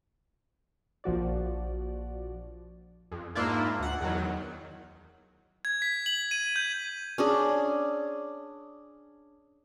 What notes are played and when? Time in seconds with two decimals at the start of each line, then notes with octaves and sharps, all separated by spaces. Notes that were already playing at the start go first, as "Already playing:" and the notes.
1.04 A#1 F3 F#4 D5
3.12 F2
3.35 G#2 A#3 D4 E4 F4
3.79 D2 F#5
4.01 E2 D#3 F#3
5.65 G#6
5.82 B6
6.06 F#7
6.31 D#7
6.56 G6
7.18 C#4 D4 G#4